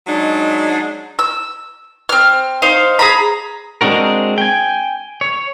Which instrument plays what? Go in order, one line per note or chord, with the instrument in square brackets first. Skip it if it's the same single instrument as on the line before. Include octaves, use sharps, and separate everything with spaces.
[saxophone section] F#3 G#3 D4 D#4
[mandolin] E6
C4 F6
D#4 C5 F5
G#4 A#5 B5
[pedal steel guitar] G#3 C4 D4 F#4 A#4
G5 G#5
C#5